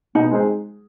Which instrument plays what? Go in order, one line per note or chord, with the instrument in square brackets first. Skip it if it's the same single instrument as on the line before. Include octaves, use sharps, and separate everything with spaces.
[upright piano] B2 [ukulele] D#4
[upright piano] G#3 C4 D#4 G#4